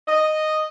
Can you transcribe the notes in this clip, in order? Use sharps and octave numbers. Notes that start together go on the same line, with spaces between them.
D#5